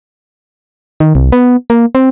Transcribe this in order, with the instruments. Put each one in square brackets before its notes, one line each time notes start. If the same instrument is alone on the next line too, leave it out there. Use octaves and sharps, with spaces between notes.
[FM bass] D#3
C2
B3
A#3
C4